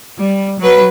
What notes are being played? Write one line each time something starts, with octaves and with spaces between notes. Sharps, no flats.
G3
F#3 B4